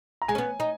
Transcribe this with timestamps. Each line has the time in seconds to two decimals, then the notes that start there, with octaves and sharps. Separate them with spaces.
0.22 A#5
0.28 G#3 G#5
0.35 C#4
0.38 B3
0.60 D#4